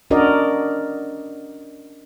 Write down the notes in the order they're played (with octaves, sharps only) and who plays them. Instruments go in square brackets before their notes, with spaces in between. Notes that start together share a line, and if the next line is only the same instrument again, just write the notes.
[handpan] C#4 D4 F#4 A#4 D5 D#5